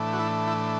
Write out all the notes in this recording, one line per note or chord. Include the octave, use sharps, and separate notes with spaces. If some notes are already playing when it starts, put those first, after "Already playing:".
Already playing: A2 E3 A3 D4
F#4
E4
E4